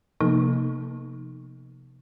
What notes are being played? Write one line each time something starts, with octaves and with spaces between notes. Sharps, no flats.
C3 F3 A#3 B3 D#4 A4